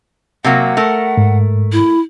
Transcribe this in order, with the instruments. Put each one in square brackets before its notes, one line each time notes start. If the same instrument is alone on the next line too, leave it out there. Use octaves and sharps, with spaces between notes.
[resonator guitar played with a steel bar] C3 F#3 A#3 [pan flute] F#5
[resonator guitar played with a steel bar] A3 A#4
[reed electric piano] G#2
[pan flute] E4